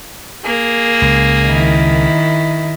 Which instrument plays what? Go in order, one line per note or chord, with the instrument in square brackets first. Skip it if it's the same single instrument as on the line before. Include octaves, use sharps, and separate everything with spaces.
[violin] A#3 G#4
[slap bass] C#2
[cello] D#3 E4